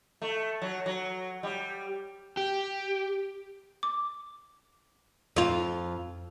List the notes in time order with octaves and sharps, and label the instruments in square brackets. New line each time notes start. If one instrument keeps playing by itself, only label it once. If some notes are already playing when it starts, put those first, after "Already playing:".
[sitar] A3
F#3
F#3
G3
[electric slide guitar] G4
[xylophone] D6
[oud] F2 F4